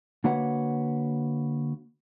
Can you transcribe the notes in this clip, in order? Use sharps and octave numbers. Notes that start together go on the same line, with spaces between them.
D3 A#3 F#4 B4 C#5 F#5